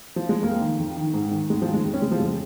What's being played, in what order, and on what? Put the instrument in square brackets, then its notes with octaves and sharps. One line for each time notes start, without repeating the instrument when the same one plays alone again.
[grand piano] F3
G#3
F2 A#3
D#3
F2
D#3
G#2
D#3
G#2 G#3
F3
D#3
G#3
F2
C#4
C#3 G#3
F3
F2 G#3